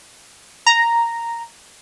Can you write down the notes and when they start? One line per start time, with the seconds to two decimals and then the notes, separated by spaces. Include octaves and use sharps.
0.66 A#5